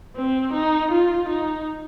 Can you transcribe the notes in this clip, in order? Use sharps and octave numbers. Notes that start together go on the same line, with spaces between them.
C4
D#4
F4
D#4